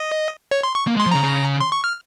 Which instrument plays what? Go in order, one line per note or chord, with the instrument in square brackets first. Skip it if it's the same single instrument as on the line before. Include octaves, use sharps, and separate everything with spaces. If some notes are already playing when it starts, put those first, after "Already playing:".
Already playing: [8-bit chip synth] D#5
C#5
C6
C#6
[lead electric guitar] A#3
G#3
[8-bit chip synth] C6
[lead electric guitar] F3
[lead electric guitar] C#3 [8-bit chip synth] A#5
[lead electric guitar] C#3
[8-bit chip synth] C6
C#6
F6